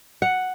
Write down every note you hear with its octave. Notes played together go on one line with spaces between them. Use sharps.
F#5